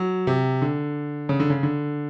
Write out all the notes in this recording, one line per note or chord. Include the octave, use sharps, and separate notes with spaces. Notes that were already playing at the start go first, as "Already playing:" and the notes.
Already playing: F#3
C3
D3
C#3
D3
C#3
D3